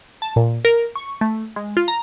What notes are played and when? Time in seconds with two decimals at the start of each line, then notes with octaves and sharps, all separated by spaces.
0.22 A5
0.36 A#2
0.65 A#4
0.96 C#6
1.21 A3
1.56 G#3
1.77 F4
1.88 A#5